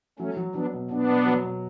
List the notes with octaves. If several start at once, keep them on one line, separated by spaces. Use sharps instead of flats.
F#3 A3 C#4
F#3
F#3 B3 D4
B2
B2 B3 D4
B2
F#3
B2